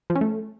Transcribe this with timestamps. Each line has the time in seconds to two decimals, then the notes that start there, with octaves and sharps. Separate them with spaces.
0.10 F3
0.15 C#4
0.21 A3